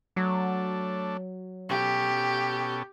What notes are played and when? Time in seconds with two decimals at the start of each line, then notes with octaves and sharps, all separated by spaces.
0.17 F#3 A3 D4
1.69 B2 C#4 G4 A4